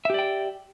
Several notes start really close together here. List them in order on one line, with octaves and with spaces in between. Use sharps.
E5 G4 D5 G5